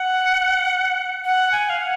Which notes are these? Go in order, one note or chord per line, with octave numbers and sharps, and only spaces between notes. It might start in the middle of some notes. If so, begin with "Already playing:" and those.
Already playing: F#5
F#5
G#5
F5
F#5